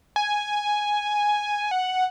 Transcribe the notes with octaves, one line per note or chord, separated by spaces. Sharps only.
G#5
F#5